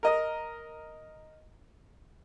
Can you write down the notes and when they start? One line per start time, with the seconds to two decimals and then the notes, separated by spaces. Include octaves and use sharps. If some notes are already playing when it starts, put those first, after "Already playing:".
0.03 A#4 D#5 D#6